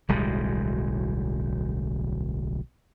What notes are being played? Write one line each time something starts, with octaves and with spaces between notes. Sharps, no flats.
D1 B1 G3 G#3